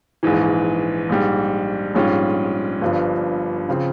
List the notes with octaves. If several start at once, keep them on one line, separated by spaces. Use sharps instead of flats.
A#1 G#2 E3
A#1 G#2 G3
A#1 G#2 G3 C#4 F4
G1 G2 F3
C#3 F3 C4